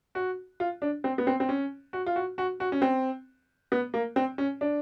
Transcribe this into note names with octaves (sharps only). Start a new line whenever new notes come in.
F#4
F4
D4
C4
B3
C4
C4
C#4
F#4
F4
F#4
F#4
F#4
C#4
C4
B3
A#3
C4
C#4
D4